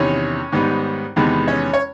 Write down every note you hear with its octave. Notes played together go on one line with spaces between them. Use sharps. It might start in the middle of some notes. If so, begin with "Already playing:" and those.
Already playing: E2 C3 D#3 C#4 C#5
G#2 D#3 G3 B3
E2 C3 D#3 G#3 B3
C#4 C#5
C#5